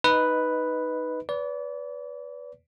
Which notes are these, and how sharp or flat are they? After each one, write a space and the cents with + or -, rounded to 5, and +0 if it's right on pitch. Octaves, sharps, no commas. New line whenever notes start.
D#4 +0 B4 +0 D#5 +15
B4 +0 D5 -35